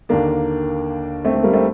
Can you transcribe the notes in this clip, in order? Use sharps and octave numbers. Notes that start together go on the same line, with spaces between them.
D#2 D3 A#3 D4
A3 C4
A3
G3 A#3
A3 C4